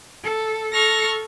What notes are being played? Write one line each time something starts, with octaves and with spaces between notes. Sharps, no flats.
A4
A4 C#6 F6 A#6